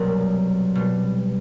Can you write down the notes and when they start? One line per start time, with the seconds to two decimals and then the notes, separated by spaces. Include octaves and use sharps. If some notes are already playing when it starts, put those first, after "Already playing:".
Already playing: C2 B2 F#3 A#3
0.75 B2 G3